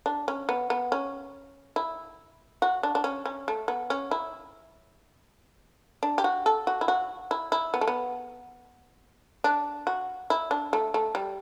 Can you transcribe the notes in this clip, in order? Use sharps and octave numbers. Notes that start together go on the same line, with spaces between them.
D4
C#4
B3
B3
C#4
E4
F#4
D4
D4
C#4
C#4
A3
B3
C#4
E4
D4
G4
F#4
A4
F#4
E4
F#4
E4
E4
B3
A3
B3
D4
F#4
E4
D4
A3
A3
G3